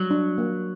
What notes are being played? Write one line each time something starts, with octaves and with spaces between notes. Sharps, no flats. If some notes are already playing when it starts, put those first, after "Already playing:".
Already playing: F#3 G3
D4
A#3